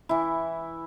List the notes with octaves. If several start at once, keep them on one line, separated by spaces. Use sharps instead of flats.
E3 E4